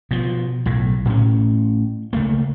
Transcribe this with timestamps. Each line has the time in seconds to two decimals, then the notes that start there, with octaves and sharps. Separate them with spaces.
0.11 B2 F3
0.66 B1 A2
1.05 A2 C#4
2.13 C#2 A3 A#3